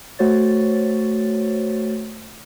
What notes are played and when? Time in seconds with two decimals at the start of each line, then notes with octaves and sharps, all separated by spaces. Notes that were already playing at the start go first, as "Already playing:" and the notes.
0.19 A3 F#4 C5 C#5 A6